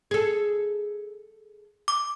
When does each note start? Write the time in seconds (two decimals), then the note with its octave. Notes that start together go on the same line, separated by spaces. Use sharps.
0.11 G#4 A4
1.88 D6